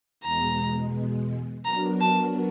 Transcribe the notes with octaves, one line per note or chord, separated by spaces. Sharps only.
E2 B2 G#3 A#5
F#3 B3 D4 F#4 A#4 A#5
A5